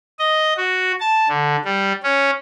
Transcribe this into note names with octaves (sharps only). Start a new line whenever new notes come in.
D#5
F#4
A5
D3
G3
C#4